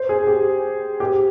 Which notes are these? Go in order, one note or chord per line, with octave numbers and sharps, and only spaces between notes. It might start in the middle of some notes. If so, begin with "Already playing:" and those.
Already playing: C5
G#4
G4
G4